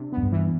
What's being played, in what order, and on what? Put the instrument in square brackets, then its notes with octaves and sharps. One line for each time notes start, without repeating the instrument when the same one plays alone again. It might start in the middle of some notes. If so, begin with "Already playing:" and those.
Already playing: [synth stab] C3 D4
[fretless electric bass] F#2 [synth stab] B3
[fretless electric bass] G2
[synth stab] E3